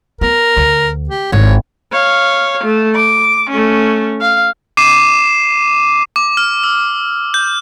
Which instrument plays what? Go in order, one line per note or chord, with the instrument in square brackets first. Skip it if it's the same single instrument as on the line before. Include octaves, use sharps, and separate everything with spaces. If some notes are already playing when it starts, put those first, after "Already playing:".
[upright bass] B3 [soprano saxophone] A#4
[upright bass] D2
[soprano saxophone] G4
[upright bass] G#1 E4 [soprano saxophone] C#5
[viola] C#5 F5
A3
D6
A3 C#4
F5
[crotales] D6 C7 D#7 E7
D6
F6
E6
G6